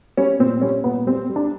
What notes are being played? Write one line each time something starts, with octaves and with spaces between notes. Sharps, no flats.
G3 C#4
A#2 C4
G3 C#4
A#2 B3
G3 C4
G3
D4